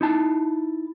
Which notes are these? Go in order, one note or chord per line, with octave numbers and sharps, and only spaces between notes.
D#4 E4 A5